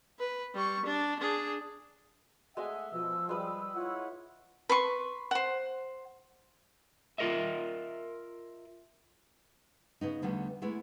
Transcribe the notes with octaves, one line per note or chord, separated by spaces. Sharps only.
B4
G3 C#6
D4
D4 G#4
G#3 A3 D#5 E5 F#5 G#5
B2 F3 E6
G3 G#3 B4 D#6
E4 F4 C#5 F#5
B4 C6 C#6
C5 F#5
F4 F#4 A#4 D#5 E5
C#3 B3 D#4
E2 D3 G3 A3 B3
G#3 A3 B3 E4